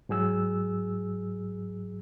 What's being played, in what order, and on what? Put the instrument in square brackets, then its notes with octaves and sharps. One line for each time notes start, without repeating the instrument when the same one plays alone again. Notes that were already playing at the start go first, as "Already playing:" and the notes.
[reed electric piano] G#2 F#3 G#4 E6